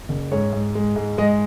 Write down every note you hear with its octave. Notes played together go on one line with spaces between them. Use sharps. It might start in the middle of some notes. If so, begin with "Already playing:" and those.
F#1
G#2 C#5
G#2
G#3
G#2
G#3 D#5